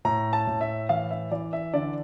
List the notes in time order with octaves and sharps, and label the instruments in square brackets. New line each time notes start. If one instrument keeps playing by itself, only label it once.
[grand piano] A2 A#5
A5
A2
E5
E3 F5
E5
E3 D5
E5
D3 D5